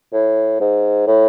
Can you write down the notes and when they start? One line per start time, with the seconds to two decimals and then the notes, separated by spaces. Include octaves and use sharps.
0.13 A2
0.61 G#2
1.08 A2